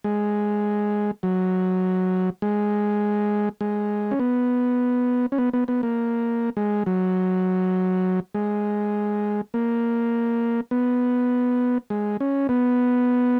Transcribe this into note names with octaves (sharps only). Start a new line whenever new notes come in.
G#3
F#3
G#3
G#3
C#4
B3
C#4
B3
B3
B3
A#3
G#3
F#3
G#3
A#3
B3
G#3
C#4
B3